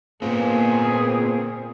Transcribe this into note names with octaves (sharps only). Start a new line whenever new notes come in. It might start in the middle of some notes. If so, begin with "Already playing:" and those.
A#2 B3 C4 F4 G#4